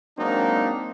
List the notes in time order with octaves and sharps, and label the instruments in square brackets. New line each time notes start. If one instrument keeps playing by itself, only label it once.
[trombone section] F#3 G#3 A#3 C4 D4 D#4